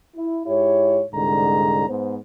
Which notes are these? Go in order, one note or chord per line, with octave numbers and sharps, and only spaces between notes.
E4
G#2 E4 G4 C#5
C2 G#2 D3 G#3 A#5
G#2 B3 C5